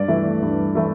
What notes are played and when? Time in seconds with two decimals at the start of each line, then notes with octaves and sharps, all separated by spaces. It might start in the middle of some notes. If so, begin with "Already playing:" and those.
Already playing: G2 D5
0.08 E3 A3 E4
0.42 G2
0.75 E3 A3 E4